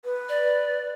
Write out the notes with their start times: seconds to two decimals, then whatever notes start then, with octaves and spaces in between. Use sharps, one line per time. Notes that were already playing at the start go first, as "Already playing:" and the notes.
0.04 B4
0.29 D5